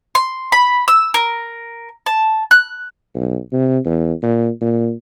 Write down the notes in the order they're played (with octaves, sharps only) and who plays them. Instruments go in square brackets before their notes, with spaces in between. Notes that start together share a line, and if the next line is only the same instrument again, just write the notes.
[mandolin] C6
B5
E6
A#4
A5
F#6
[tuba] B1
C3
E2
A#2
A#2